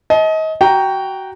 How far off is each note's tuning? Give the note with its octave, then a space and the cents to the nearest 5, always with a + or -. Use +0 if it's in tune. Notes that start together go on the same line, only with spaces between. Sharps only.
D#5 +30 A5 -30
F#4 +20 G5 +0 A#5 +0